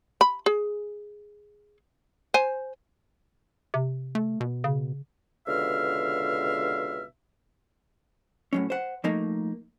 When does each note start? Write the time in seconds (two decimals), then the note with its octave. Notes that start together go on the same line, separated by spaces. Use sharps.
0.21 B5
0.46 G#4
2.34 C5 G#5
3.74 C3
4.15 A3
4.40 B2
4.64 C#3
5.47 C#2 B2 D3 E5 F5 F6
8.53 A2 F#3 C#4
8.70 C5 F#5
9.04 F3 A3 A#3 D#4